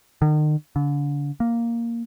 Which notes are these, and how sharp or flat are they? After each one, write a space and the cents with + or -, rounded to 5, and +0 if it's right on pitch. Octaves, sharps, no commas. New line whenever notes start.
D#3 -40
D3 -35
A#3 +0